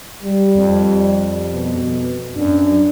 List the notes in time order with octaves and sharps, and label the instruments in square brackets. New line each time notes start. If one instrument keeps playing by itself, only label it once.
[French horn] G3
[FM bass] F2
[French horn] B2
[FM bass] F#2 [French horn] D4